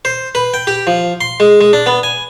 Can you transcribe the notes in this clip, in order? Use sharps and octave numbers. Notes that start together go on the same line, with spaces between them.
C5
B4
G5
G4
F3
C6
G#3
G#3
D4
B3
G#5